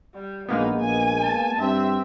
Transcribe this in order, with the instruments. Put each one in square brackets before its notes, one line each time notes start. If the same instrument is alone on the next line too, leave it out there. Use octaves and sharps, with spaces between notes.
[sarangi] G3
[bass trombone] A#1 [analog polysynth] G#3 A#3 B3 [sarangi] D#4
[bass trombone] A#1 [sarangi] G#5
[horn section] A5
[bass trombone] G2 [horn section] C4 [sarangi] E5